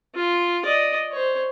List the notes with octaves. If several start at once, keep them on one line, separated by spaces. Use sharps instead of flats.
F4
D5 D#5
C5 C#5